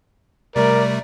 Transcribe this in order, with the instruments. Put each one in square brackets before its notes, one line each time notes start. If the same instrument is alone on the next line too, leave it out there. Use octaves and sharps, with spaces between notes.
[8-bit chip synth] C3 G3 A3 [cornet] A#4 [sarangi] D5